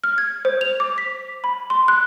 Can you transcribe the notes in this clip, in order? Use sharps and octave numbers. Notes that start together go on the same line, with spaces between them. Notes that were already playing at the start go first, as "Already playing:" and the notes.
F6
G#6
C5
F7
D6
B6
B5
C6
F#6